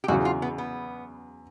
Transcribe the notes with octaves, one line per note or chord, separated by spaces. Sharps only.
G4
E2 C#3 F#3 F#4
F4
B3
B3